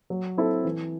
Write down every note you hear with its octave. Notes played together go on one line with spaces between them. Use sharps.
F#3
C4 E4 A4
E3